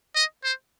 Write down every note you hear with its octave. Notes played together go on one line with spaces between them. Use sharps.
D#5
C5